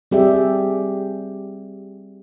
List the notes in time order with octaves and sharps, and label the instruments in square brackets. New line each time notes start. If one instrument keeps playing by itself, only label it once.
[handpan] G3 C4 G4 G#4 D5 E5